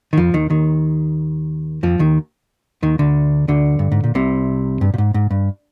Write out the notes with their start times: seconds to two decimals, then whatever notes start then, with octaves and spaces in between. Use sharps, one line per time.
0.13 D#3
0.17 F2 F3
0.34 D#2 D#3
0.50 D#2 D#3
1.83 F2 F3
1.99 D#2 D#3
2.82 D#2 D#3
2.99 D2 D3
3.48 D2 D3
3.79 G2
3.92 G#2
4.04 A#2
4.15 C2 C3
4.81 G2
4.94 A#2
4.98 G#2
5.14 G#2
5.31 G2